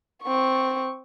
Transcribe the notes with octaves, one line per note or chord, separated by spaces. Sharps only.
C4 C#6